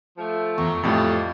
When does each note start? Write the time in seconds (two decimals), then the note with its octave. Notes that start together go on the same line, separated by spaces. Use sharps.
0.18 F3 A3
0.58 E2 A#5 C#6
0.83 F2 A2 G3 F4 D5 D#5